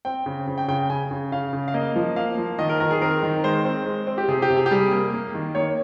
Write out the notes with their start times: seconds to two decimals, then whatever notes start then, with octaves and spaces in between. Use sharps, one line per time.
0.05 C4 G5
0.26 C#3
0.47 C#3
0.58 G5
0.68 C#3 G5
0.79 G5
0.90 C#3 G#5
1.11 C#3
1.32 C#3 F5
1.53 C#3
1.68 F5
1.74 A#3 D#5
1.96 F3
2.16 A#3 F5
2.38 F3
2.59 D#3 D#5
2.69 A#4
2.80 D#3 A#4
2.91 G#4
3.02 C4 A#4
3.23 D#3
3.44 G#3 C5
3.65 C4
3.86 G#3
4.07 C4
4.18 G4
4.28 C3 G#4
4.42 G4
4.50 C3
4.57 G#4
4.66 G4
4.71 G3 G#4
4.92 A#3
5.14 A#3
5.34 D#3
5.55 A#3 C#5